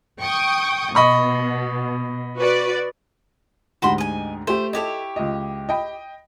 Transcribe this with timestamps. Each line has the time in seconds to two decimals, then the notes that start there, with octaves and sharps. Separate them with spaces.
0.21 G5 C#6 D#6
0.95 B2 D#5 B5 C#6
2.37 F#4 B4 D5
3.82 D2 G#2 F#4 G4 B5 C6
3.98 D#5 G#5
4.47 A3 G4 C5
4.73 E4 G4 A4 C#5 D#5
5.16 C#2 D#5
5.69 D#5 G5 B5